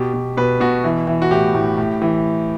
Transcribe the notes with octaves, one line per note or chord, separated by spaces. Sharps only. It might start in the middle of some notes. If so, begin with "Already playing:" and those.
Already playing: B2 G4
B2
B2 B4
B2 F#4
E3
E3
F#4
A2 G4
A2
A2
E3